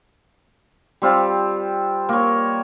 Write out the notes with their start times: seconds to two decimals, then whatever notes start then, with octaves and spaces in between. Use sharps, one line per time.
1.02 G3 C4 F4
2.09 A#3 C#5